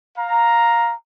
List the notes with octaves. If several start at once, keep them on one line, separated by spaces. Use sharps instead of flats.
F5 A#5